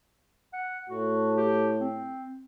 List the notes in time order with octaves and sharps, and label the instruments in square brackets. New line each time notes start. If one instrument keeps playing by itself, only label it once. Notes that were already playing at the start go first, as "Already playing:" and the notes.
[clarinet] F#5
[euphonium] A2 [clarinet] F#4
[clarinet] G4
C4